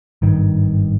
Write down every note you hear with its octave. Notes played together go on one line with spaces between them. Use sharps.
G#1 G2 D#3